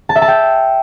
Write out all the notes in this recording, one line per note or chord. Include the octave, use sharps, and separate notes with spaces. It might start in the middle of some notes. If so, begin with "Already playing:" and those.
A5
E5
A5
G5